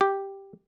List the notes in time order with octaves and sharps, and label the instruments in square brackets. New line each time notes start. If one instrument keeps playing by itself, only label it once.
[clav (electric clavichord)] G4